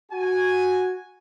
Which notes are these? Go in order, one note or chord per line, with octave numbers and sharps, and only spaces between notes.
F#4 G#5